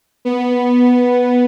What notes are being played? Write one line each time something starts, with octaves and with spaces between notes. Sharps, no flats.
B3